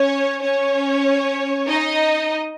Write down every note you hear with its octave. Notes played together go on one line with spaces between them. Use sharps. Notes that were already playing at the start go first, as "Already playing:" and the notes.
Already playing: C#4 C#5
C#4 C#5
D#4 D#5